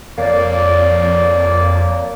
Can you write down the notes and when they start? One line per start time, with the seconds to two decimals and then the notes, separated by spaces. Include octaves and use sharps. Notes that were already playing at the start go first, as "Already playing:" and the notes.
0.18 F2 A#3 C#5 D5